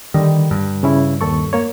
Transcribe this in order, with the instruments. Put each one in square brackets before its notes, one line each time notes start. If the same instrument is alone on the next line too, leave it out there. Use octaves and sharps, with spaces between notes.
[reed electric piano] D3 G3 [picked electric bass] D#3
[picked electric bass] G2
[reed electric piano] C#3 C#4 E4
D#2 A4 C#6
A#3 C#5